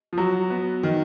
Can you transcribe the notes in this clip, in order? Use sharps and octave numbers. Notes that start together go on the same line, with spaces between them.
F3
F#3 F#4
B3
D#3